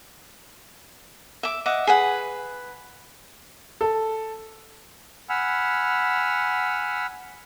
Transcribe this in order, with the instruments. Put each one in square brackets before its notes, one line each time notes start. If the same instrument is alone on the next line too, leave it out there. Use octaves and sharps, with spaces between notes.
[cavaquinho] E5 D6
D#5 E5 F#5 D6
G#4 B4 F#5
[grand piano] A4
[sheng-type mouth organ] F#5 G#5 B5 E6 F6